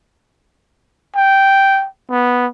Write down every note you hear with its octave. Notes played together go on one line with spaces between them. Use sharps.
G5
B3